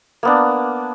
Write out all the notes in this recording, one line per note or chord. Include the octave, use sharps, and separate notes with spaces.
A#3 B3 D4